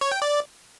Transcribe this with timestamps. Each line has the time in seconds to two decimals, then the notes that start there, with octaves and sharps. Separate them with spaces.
0.01 C#5
0.12 G5
0.22 D5